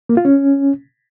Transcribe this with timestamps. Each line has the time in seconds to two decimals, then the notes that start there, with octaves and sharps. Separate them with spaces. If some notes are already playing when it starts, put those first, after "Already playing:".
0.09 A#3
0.17 F4
0.25 C#4